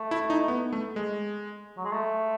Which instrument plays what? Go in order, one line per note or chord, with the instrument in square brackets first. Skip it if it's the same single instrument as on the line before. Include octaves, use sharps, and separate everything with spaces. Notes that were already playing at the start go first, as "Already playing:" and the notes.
Already playing: [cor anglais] A3
[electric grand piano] E4
D#4
B3
A3
G#3
[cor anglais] F#3
G#3
A3